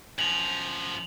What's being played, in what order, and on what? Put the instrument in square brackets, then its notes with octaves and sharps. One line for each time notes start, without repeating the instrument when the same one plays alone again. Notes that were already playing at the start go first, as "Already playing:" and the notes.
[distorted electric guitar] F#2 F3 [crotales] F7 F#7